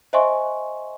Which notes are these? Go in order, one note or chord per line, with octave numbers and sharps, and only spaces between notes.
C5 D#5 E5 G#5 C6 C#6